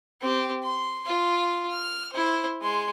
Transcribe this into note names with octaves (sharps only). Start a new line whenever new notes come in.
C4 G4
C6
F4
F6
E4 C5
G#3 C6